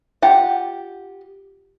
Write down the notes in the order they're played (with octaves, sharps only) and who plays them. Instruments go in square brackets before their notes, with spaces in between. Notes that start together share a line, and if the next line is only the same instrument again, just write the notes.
[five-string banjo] F4 G4 F#5